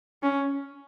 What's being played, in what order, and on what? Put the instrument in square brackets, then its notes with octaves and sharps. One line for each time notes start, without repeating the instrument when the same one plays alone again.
[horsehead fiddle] C#4